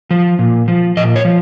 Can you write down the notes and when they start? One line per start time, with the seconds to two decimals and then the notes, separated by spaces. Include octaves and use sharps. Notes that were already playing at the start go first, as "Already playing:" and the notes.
0.11 F3
0.39 A#2
0.68 F3
0.97 A#2 D#5
1.16 C#5
1.25 F3